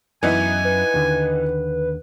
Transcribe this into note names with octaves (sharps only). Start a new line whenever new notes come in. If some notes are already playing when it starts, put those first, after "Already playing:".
F#2 E3 B3 D#4 D#5 E5 G#5
B4
D#2 D3